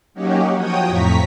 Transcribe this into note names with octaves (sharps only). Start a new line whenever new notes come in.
F#3 A#3 C#4 D#4 F#4 G4
F3 F#4 C#5 G5 D#6
F2 A2 A#5 C#6 B6